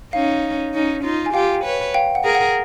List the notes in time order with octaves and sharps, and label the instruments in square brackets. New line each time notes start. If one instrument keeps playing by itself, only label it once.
[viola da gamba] C#4 D#4 [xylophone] F5
[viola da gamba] C#4 D#4
D#4 F4
[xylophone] G#5
[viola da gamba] F4 G4 [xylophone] F5 G5
[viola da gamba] B4 C#5
[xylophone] F5 G5
F#5
[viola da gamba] G#4 A#4
[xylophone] F#5